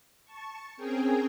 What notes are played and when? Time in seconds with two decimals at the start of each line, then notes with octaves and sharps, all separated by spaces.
0.25 A5 C#6
0.77 C4 C#4 G#4 A#4 G5 G#5